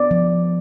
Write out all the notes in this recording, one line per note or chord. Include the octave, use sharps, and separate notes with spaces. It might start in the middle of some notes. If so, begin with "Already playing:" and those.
Already playing: B3 D5
F3